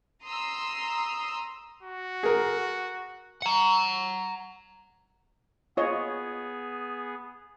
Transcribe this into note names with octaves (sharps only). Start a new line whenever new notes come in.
A#5 C6 D#6 E6
F#4
G#4 A#4
F#5 A#5
B3 F4 G#4 C#5 D#5